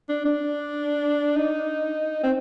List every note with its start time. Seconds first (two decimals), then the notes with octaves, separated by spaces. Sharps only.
0.09 D4
0.25 D4
1.36 D#4
2.23 C4